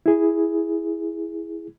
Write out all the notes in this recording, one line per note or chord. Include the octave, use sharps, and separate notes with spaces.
E4 G#4